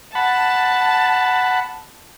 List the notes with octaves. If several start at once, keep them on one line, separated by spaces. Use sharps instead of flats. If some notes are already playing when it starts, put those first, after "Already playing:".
F#5 A5 B5